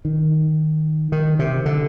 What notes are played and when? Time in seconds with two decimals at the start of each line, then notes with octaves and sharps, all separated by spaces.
0.05 D#3
1.12 D#3
1.39 C3
1.66 D3